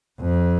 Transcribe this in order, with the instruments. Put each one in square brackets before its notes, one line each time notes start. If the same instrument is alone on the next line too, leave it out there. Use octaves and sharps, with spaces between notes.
[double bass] F2